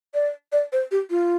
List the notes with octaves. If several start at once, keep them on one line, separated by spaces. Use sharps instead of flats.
D5
D5
C5
G4
F4